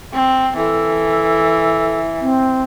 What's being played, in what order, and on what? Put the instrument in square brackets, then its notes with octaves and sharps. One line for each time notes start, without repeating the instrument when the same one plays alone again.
[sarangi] C4
[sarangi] E3 [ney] A4
[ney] C4